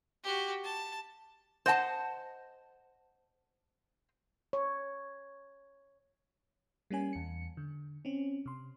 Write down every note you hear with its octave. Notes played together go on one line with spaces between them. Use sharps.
F#4 G4
A5
C5 D#5 F#5 G#5 A5
C#5
G3 A#3 C#4 G#5
E2 C#7
D3
C4 C#4
C3 C6